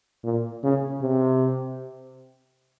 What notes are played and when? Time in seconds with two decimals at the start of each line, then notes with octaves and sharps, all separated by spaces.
0.24 A#2
0.63 C#3
1.02 C3